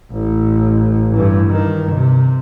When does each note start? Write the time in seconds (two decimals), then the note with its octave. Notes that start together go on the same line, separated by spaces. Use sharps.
0.12 A1 A2
1.14 G2 E3
1.48 G2 D#3
1.95 C3